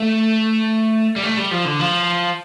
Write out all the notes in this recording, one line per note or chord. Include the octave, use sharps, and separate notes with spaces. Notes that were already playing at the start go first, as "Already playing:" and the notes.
Already playing: A3
G3
A3
G3
F3
D3
F3